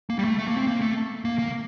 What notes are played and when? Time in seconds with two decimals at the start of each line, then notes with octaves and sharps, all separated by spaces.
0.10 A#3
0.19 G3
0.24 A3
0.39 A3
0.48 A#3
0.57 C4
0.67 A#3
0.82 A3
1.25 A#3
1.39 A#3